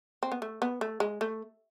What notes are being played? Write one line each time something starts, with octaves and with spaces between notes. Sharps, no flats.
C4
B3
A3
B3
A3
G#3
A3